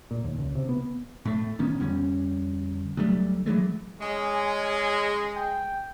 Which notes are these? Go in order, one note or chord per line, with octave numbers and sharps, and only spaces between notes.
A#2
D#2
C#2
C3
B3
A2 A3
A1 D#3 B3 C#4
F2 D3 G3 C#4
D2 F#3 G3 A3
E3 F#3 G#3 A3
G#3 C#4
G5